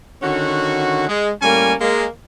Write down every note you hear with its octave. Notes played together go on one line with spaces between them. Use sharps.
D3 D#3 C#4 F#4
G#3
A2 G3 A#3 C#4 G#5
G#3 A#3